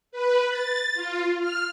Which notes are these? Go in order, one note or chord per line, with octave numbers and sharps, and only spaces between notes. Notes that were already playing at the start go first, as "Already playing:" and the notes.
B4
A6
F4
F6